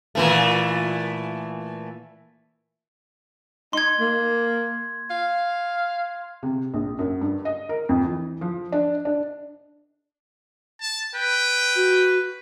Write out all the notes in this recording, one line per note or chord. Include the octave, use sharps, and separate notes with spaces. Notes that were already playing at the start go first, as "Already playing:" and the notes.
A#2 E3 A3
D#4 C6 G#6
A#3
F5
C3
A#1
F#2
G2
D#5
A#4
F2
E3
F3
D4
D4
A5
B4 G5
F#4